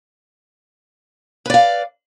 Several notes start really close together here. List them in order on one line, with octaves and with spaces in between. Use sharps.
B4 D5 F5